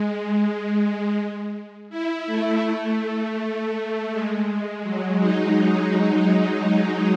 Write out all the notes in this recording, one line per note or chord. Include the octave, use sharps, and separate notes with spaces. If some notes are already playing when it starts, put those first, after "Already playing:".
Already playing: G#3
E4
A3
G#3
F#3
D#4